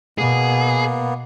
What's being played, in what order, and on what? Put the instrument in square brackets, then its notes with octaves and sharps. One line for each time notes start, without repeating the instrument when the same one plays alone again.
[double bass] B2 [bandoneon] A#3 B3 [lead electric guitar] G#4